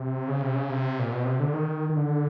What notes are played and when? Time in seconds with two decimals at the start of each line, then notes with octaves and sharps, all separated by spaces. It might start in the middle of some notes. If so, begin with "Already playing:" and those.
Already playing: C3
0.28 C#3
0.42 C3
0.55 C#3
0.70 C3
0.99 A#2
1.12 B2
1.25 C3
1.40 D3
1.53 D#3
1.90 D#3
1.96 D3